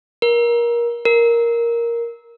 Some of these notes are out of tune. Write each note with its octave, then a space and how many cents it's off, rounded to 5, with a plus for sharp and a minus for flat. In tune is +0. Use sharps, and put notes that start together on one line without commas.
A#4 +25
A#4 +5